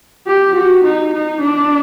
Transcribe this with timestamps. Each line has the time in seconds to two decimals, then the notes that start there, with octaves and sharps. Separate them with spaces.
0.27 G4
0.55 F#4
0.84 D#4
1.14 D#4
1.41 D4